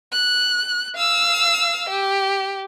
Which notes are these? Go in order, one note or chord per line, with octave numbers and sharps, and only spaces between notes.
F#6
F5 E6
G4